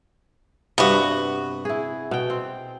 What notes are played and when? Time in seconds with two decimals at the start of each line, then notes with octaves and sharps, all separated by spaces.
0.78 G2 C3 B3 F#4
1.65 E4 G#4
2.11 B2 G5
2.30 C4